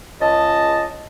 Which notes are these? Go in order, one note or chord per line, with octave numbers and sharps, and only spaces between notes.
C#2 D#5 A5